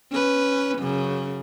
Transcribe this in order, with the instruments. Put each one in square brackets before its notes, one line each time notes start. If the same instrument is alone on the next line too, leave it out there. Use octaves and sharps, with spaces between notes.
[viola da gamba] C#4 B4
F#2 C#3